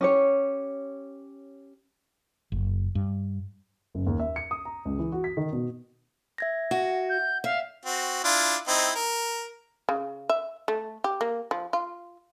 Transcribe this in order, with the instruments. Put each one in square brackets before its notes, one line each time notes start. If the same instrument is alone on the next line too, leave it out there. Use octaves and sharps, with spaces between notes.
[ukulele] C#4 G4 C#5
[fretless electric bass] F#1
G2
[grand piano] F#1
D#2
E5
C#7
D#6
A#5
C#2
E3
F#4
B6
D#3
B2
[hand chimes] E5 G#6 A#6
[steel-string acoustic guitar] F#4
[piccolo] G6
[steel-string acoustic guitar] E5 [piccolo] F5
[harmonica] C4 F#4
D4 E4 F4
C4 D#4 E4
A#4
[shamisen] C#3
E5
A3
G4
A#3
F3
F4